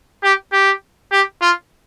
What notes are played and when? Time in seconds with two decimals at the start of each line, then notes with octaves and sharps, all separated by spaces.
0.24 G4
0.53 G4
1.12 G4
1.41 F4